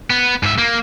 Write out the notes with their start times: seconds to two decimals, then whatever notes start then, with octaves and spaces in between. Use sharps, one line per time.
0.10 B3
0.43 G#2 E5
0.58 A#3